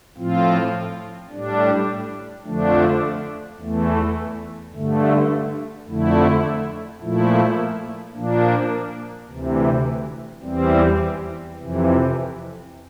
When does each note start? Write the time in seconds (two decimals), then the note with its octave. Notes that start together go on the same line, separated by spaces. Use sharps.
0.18 A2 F3 C4 F4
1.31 A2 G3 D4
2.45 F2 D3 F3 A3 D4
3.59 E2 E3 A3
4.74 G2 D3 A3
5.87 F2 D3 A3 E4
7.01 A#2 F3 A3 E4
8.15 A#2 F3 A#3 D4
9.29 D2 C3 E3
10.43 E2 E3 G3 C4
11.56 F2 C3 E3